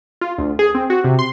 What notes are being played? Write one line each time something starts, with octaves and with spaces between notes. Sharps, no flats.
F4
D2
G#4
C4
F#4
C3
C6